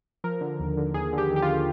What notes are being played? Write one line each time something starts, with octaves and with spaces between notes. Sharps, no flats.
F3 A#4
D3
D#2
D3
D#2 G#4
D3 G4
D#2
G4
F4